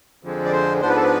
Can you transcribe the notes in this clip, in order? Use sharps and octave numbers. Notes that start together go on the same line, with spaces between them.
F2 D3 F3 G#3 C4
D5
C5
G#2 F3 B3 D4 C5
B4
A4
B4